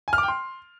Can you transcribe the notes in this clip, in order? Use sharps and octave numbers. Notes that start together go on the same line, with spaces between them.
G#5
F6
D6
G5
C6